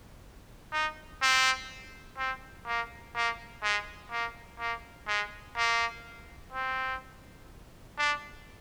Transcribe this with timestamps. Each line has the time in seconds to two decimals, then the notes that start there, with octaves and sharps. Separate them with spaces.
0.72 D#4
1.22 C4
2.18 C4
2.67 A#3
3.15 A#3
3.63 G#3
4.11 A#3
4.59 A#3
5.08 G#3
5.57 A#3
6.52 C4
7.98 D4